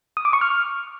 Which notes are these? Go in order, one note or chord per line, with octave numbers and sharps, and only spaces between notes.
D#6
D6
C#6
F6